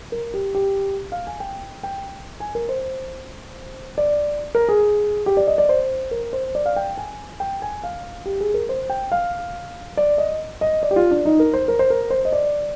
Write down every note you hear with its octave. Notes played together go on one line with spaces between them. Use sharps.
A#4
G4
G4
F5
G#5
G5
G5
G#5
A#4
C5
D5
A#4
G#4
G4
D5
D#5
D5
C5
A#4
C5
D5
F5
G5
G#5
G5
G#5
F5
G4
G#4
A#4
C5
G5
F5
D5
D#5
D#5
D5
G4
F4
D4
D#4
A#4
C5
A#4
C5
A#4
C5
D#5
D5